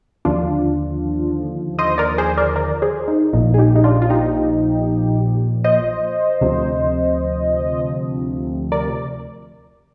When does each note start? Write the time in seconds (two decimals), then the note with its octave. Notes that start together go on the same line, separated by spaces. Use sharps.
0.25 D#2 D3 F3 D4 F4
1.79 C5 D#5
1.98 A#4 D5
2.18 G#4 C5
2.38 A#4 D5
2.56 A#4 D5
2.82 G#4 C5
3.08 D#4
3.33 A#1 A#2 F3 D#4
3.54 G#4
3.58 D#4 G4
3.76 D#4
3.84 D4 F4
4.02 F4
4.10 D#4 G4
5.64 C5 D#5
6.41 D2 C3 F3
8.72 A#4 D5